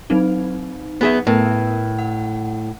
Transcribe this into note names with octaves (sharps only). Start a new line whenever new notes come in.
F#3 C4 D#4
B3 G#4 E5
A2 B3 A#4 B4
F#5